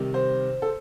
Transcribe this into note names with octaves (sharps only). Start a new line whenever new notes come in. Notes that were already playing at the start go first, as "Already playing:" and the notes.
Already playing: C3 D#3 G3
C5
A4